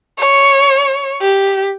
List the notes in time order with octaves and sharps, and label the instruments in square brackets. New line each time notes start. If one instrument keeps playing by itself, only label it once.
[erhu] C#5
G4